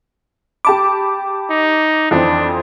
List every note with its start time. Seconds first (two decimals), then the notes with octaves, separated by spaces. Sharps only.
0.65 G4 A5 B5 D6
1.50 D#4
2.11 F2 E3 C4 D4